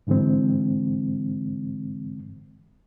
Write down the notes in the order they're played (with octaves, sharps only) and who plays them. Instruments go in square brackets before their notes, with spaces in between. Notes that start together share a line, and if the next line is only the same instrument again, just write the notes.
[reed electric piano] G#2 D3 E3 G#3 C4